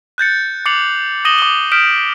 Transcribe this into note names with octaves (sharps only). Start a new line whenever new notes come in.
F#6 G6 A6 C#7
D6 A6 C7 C#7 F7 F#7
D#6 A#6 D#7 E7 F#7 G7
D6 D#6 G7
D#6 F6 G6 B6 D7 E7